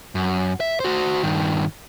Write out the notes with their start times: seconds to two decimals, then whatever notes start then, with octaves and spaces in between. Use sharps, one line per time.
0.15 F#2
0.60 E5
0.80 F#4 C5
1.23 G2 D#3